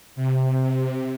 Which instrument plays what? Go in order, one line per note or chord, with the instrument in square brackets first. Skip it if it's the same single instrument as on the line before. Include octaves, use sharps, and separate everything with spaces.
[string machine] C3